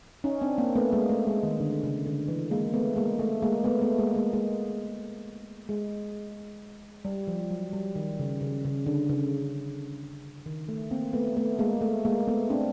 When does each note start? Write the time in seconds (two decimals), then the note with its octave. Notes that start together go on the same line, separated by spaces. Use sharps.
0.24 C#4 D#4
0.41 C4 D4
0.58 A#3 C4
0.75 A3 B3
0.93 G#3 A#3
1.09 A3
1.27 G#3
1.43 D#3
1.60 D3
1.83 C#3
2.06 D3
2.28 E3
2.51 G#3 A#3
2.73 A3 B3
2.96 G#3 A#3
3.19 A3
3.42 G#3 A#3
3.64 A3 B3
3.82 A3 B3
3.98 G#3 A#3
4.15 G#3 A#3
4.33 G#3 A#3
5.69 G#3
7.05 G3
7.27 F3
7.51 F#3
7.73 G3
7.96 D#3
8.19 C#3
8.41 C#3
8.65 C#3
8.86 D3
9.09 C#3
10.46 D#3
10.69 A3
10.91 A#3 C4
11.13 A3 B3
11.37 A3 B3
11.59 G#3 A#3
11.81 A3
12.05 G#3 A#3
12.27 A3 B3
12.50 C4 D4